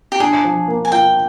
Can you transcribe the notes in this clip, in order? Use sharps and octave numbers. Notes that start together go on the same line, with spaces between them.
G4
D4 G#4
F3
A#3
G#5
F4 G5